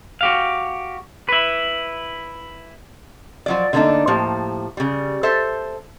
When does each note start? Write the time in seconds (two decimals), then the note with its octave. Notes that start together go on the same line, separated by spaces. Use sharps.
0.21 F#4 G4 F5
1.29 E4 B4
3.46 F3 F#3 D5
3.73 D3 A3 A#3 C4 D4 D#4
4.07 A2 F3 A#3 G4
4.77 C#3 G3
5.23 A4 C5 E5